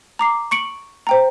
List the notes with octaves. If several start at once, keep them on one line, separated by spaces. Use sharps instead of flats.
A#5 D6 C7
C#6 C#7 D7 F#7
C5 G5 A#5